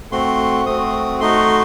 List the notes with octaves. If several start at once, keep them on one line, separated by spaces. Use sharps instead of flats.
A3 C4 F#4 C6
A3 C4 F#4 D#6
A3 D#4 F#4 C6